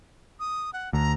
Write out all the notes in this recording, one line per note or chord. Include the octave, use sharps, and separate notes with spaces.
D#6
F#5
D2 A#5